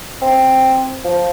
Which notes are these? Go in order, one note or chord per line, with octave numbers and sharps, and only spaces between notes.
C4
F3